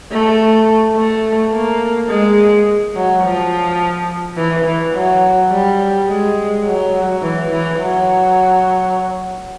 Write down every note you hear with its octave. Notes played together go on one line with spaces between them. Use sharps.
A3
A3
A#3
G#3
F#3
F3
E3
E3
F#3
G3
G#3
F#3
E3
E3
F#3